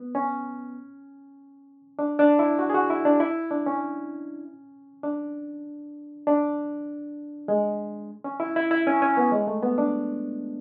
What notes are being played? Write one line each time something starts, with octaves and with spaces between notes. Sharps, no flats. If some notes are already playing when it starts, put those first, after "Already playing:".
Already playing: B3
C#4
D4
D4
E4
F#4
G#4
F#4
E4
D4
E4
D4
C#4
D4
D4
G#3
C#4
E4
E4
E4
C#4
C#4
B3
G#3
A3
B3
D4